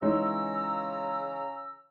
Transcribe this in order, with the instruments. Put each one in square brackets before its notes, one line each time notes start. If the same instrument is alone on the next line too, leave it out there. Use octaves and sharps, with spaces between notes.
[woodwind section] C#3 A#5 E6 [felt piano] E3 D#4 C#5 [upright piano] G#3